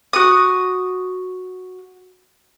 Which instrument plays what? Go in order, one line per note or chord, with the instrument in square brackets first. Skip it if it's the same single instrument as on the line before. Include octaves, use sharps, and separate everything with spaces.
[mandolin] F#4 D#6